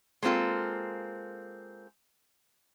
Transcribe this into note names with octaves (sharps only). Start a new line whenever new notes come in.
G#3 A#3 C4 F4 A4